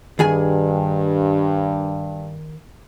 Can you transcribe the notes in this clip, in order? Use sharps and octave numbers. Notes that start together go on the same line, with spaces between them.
G2 D#3 G#4 G#5